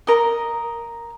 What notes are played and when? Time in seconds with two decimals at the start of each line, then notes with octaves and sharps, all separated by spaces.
0.07 A#4 D#5